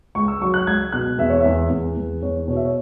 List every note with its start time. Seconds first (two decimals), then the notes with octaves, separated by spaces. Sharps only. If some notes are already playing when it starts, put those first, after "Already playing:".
0.15 C#2 C#6
0.28 E6
0.41 F#3 C#6
0.54 F#6
0.67 C#2 G#6
0.92 B2 F#6
1.18 E2 E5
1.30 C#5
1.40 E2 E5
1.70 E2
1.97 E2
2.22 E2 C#5
2.48 B2 C#5
2.56 E5
2.64 C#5